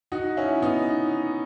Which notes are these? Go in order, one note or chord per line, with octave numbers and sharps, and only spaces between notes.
D#4 F#4
C#4 E4
B3 D#4